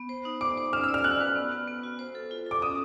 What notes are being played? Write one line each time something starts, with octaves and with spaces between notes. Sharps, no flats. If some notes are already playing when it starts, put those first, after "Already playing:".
Already playing: B3
C5
D#4
C5 D6
C5
C#4 F6
E6
D5
F6
F#4 F#6
B4
B3
B3
B3
F#4
C5
A4
F4
A4 D6
C#4 D#6